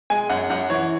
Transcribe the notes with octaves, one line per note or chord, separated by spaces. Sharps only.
G#3 G#5
F#2 F#5
F#2 F#5
E3 C#5